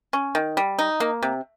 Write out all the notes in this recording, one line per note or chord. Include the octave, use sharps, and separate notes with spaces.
C#4
D#3
G3
D#4
A#3
C3